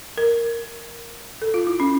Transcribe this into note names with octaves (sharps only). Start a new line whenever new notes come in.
A#4
A4
F4
E4
C#4